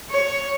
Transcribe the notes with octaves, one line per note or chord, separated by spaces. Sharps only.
C#5